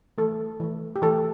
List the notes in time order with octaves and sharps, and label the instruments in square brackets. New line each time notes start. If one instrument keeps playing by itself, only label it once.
[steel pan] E3 A3 A4
E3 A3
G4
E3 A3 A4